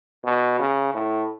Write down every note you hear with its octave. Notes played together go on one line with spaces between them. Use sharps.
B2
C#3
A2